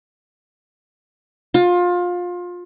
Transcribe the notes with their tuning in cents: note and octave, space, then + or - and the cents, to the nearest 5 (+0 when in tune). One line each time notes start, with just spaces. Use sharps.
F4 +25